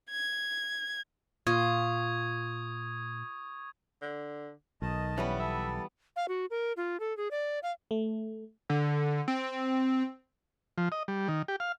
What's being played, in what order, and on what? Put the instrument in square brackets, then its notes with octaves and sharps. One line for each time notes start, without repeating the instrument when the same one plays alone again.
[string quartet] G#6
[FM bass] A#2 [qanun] F4 [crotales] C#6 D#6 G#6
[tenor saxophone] D3
[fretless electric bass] B1 [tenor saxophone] D#3 [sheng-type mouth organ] D#5 A5
[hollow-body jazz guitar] E3 G3 B3 [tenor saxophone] C#4
[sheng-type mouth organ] A4 [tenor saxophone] E5
[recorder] F5
F#4
A#4
F4
A4
G#4
D5
F5
[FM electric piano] A3
[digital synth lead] D3
C4
[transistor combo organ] F3
D#5
G3
D#3
G4
F5